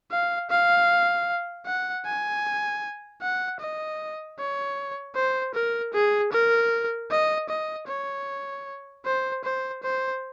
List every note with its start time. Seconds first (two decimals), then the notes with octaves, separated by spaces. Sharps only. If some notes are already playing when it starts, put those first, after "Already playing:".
0.11 F5
0.50 F5
1.66 F#5
2.05 G#5
3.21 F#5
3.60 D#5
4.39 C#5
5.15 C5
5.54 A#4
5.93 G#4
6.32 A#4
7.10 D#5
7.49 D#5
7.87 C#5
9.05 C5
9.44 C5
9.83 C5